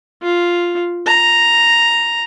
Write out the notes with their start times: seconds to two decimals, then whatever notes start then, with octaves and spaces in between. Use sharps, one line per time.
0.23 F4
1.07 A#5